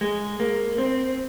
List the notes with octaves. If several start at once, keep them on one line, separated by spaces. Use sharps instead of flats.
G#3
A#3
C4